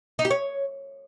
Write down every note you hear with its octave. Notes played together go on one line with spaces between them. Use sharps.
D#4
G4
C#5